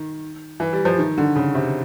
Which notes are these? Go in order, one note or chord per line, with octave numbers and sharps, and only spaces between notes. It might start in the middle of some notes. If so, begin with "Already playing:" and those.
Already playing: D#3
E3
G3
F3
D#3
D3
C#3
C3